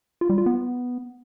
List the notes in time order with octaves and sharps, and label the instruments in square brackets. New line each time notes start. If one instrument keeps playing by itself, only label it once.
[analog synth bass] F4
G3
F4
B3